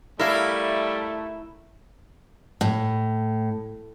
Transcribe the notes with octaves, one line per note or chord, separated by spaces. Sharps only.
G3 A3 E4 A#4 F5
A2